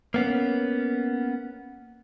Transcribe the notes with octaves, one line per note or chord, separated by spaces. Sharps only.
A#3 B3 C#4